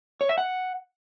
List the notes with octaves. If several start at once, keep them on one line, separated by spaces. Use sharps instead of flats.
C#5
E5
F#5